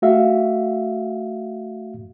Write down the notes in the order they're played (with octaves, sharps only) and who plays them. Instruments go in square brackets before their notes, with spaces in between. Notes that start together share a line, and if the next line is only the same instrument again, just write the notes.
[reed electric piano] A3 F#4 E5 F5